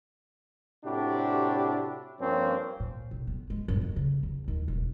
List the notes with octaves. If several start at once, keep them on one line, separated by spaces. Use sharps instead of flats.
A2 C3 D4 E4 F#4 G4
G2 F3 A#3 C4 C#4
A#2
B1
B3
G#3
F#2
F2
C#3
E2
D#2
E1